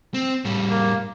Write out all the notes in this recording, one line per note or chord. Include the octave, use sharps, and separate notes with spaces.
C4
A2 G3
A#3